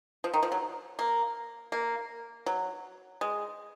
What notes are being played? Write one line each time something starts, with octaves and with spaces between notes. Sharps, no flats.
F3
D#3
F3
F#3
A#3
A#3
F#3
G#3